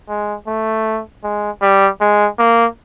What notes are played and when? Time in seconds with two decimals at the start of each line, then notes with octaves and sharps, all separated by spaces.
0.09 G#3
0.47 A3
1.24 G#3
1.62 G3
2.01 G#3
2.39 A#3